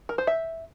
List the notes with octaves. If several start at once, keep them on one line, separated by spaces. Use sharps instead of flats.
A#4
C5
E5